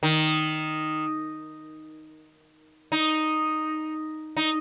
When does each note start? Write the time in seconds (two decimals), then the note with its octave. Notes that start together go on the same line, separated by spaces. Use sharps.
0.03 D#3
2.92 D#4
4.37 D#4